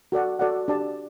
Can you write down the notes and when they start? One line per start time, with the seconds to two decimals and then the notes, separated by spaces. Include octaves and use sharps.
0.12 F#4 A4 D5 F#5
0.39 F#4 A4 D5 F#5
0.68 D4 G4 D5 A5